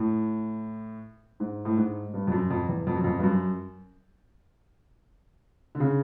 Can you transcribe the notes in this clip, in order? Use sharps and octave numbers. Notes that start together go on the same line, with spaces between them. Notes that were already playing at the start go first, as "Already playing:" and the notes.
Already playing: A2
G#2
A2
G#2
G2
F2
F#2
F2
E2
F2
F#2
F2
G2
F#2
D3
C#3